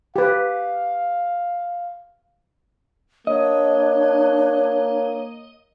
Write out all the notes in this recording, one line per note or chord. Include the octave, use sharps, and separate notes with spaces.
G4 B4 F5
A#3 D4 C#5 D#5